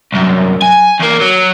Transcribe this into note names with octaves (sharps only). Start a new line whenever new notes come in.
C2 F#2
G#5
E2 A#3
F#3